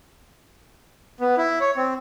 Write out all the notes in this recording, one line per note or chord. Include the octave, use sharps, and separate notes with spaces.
B3
E4
C#5
C4